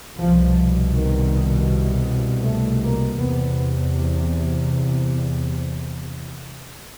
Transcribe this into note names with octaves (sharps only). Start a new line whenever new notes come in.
C2 B2 F3
D#3
A3
A#3
E2 C3 B3